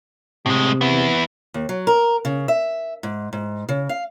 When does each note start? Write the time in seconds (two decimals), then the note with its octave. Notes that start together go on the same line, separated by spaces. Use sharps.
0.46 A2 C3 G#3
0.81 B3 E4
1.54 D#2
1.69 F#3
1.87 A#4
2.25 C#3
2.48 E5
3.03 G#2
3.33 G#2
3.69 C#3
3.89 F5